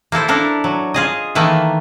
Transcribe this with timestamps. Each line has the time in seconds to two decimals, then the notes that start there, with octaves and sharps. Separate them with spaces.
0.12 A#3 E4 A4 C5
0.28 D4 E4 A4 A#4
0.64 F#3
0.94 F4 G#4 D#5
1.35 D#3 E3 A3 A#3